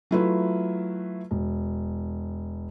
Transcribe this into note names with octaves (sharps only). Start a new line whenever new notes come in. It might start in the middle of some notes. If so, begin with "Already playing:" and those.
F#3 A3 E4 F4 B4 E5
E1